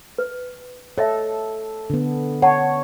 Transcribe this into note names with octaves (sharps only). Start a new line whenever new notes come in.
B4
A4 C#5 D#5 E5
D3 B3
C#5 F#5 A5